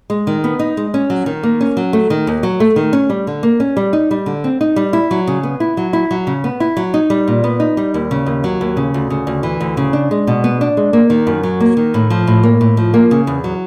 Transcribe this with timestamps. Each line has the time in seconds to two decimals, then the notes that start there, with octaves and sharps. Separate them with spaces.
0.10 G#3
0.27 D#3
0.44 B3
0.59 D#4
0.77 G#3
0.94 C#4
1.10 F#3
1.26 D#3
1.43 A#3
1.61 C#4
1.77 F#3
1.93 A3
2.10 D#3
2.27 D#2
2.43 F#3
2.60 A3
2.76 D#3
2.93 C#4
3.10 G3
3.27 D3
3.43 A#3
3.60 C#4
3.77 G3
3.93 D#4
4.11 G3
4.26 D3
4.44 C4
4.61 D#4
4.76 G3
4.93 E4
5.11 F#3
5.27 C#3
5.43 B3
5.60 E4
5.77 F#3
5.93 E4
6.11 F#3
6.27 C#3
6.44 B3
6.60 E4
6.77 F#3
6.94 D#4
7.10 G3
7.28 A#2
7.44 B3
7.60 D#4
7.77 G3
7.94 D#2
8.11 C#3
8.26 D#2
8.44 F#3
8.61 D#2
8.77 C#3
8.94 D2
9.10 C#3
9.27 D2
9.43 E3
9.60 D2
9.77 C#3
9.93 D4
10.11 G#3
10.27 B2
10.44 B3
10.61 D4
10.77 G#3
10.93 A#3
11.10 D#3
11.27 F#2
11.43 F#3
11.60 A#3
11.77 D#3
11.94 A2
12.10 F3
12.27 A2
12.43 A#3
12.61 A2
12.77 F3
12.94 A#3
13.11 C#3
13.27 E2
13.44 F#3